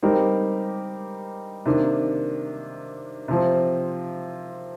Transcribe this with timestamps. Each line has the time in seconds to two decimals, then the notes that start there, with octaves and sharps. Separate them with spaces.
0.03 G3 C4 D#4 G4 A#4
1.66 C3 D#3 A#3 D4
3.28 C3 F3 C4